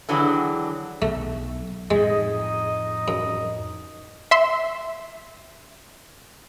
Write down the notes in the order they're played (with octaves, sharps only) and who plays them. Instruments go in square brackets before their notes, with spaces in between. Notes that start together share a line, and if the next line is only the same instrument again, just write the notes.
[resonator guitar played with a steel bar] D3 E3 F#3 D4 G4 G#4
[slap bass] B1 [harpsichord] A3
[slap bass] F2 A2 [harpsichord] G#3 [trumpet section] D#4 D#5
[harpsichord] F#2
[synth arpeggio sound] E5 C6